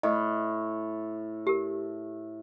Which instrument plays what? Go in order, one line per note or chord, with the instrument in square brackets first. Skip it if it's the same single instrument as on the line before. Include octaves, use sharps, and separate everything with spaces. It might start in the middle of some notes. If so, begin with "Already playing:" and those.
[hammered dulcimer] A2 [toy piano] D#5
[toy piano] G4 A#4